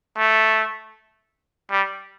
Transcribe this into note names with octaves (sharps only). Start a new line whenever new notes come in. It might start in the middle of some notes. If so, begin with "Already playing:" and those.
A3
G3